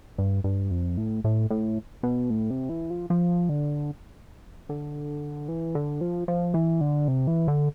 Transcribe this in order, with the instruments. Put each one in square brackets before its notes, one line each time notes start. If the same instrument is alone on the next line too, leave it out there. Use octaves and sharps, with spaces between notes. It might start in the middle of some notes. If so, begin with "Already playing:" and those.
[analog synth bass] G2
G2
F2
A2
A2
A2
B2
A2
C3
E3
F3
F3
D3
D3
E3
D3
F3
F3
E3
D3
C3
E3
D3